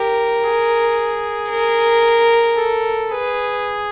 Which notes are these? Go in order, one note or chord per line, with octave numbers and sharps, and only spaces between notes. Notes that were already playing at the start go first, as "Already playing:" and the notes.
Already playing: G4 A#4
G#4
A#4
A4
G#4 B4